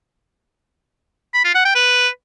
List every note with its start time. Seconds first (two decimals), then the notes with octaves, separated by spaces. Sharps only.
1.34 B5
1.44 F4
1.55 F#5
1.65 G5
1.75 B4